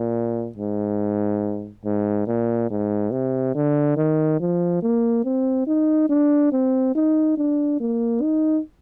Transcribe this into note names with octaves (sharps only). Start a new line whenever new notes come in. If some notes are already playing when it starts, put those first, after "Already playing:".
Already playing: A#2
G#2
G#2
A#2
G#2
C3
D3
D#3
F3
A#3
C4
D#4
D4
C4
D#4
D4
A#3
D#4